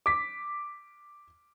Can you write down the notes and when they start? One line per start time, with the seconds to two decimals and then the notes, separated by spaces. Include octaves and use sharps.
0.06 D6 B6